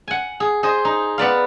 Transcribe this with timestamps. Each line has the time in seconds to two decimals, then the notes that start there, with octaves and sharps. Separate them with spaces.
0.08 F#5 G#5
0.40 G#4
0.63 G#4 C5 D#5
0.85 D#4
1.18 B3 B4 D5 F5